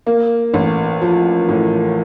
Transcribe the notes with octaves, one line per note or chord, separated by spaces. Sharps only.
A#3
A1
F3
A2